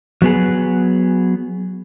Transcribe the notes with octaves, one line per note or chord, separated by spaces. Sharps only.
F#3 B3 G#4